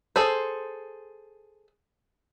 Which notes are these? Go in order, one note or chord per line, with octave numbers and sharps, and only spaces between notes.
G#4 A4 C5